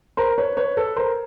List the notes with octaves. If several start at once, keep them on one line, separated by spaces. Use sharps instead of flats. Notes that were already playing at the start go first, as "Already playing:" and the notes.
A#4 C5
B4 C#5
B4 C#5
A4 B4
A#4 C5